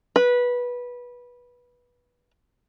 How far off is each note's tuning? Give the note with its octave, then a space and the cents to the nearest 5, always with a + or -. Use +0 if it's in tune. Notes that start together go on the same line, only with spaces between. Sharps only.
B4 -15